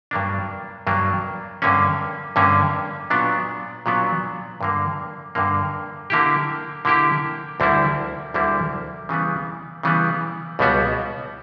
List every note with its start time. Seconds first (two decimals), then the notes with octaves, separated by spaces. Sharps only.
0.11 G2 F#3 A#3 D4
0.87 G2 F#3 A#3 D4
1.62 G2 D3 A#3 C#4
2.36 G2 D3 A#3 C#4
3.10 A#2 F#3 B3 D4
3.86 A#2 F#3 B3 D4
4.61 G2 D3 A#3
5.35 G2 D3 A#3
6.10 D3 A#3 E4 G4
6.85 D3 A#3 E4 G4
7.60 D2 D3 G3 A#3 E4
8.34 D2 D3 G3 A#3 E4
9.09 C#3 E3 G3 B3
9.83 C#3 E3 G3 B3
10.59 C#2 B2 G3 B3 F#4